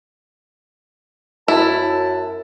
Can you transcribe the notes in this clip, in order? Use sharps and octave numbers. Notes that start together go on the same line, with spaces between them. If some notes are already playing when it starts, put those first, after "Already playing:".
F#2 E4 A5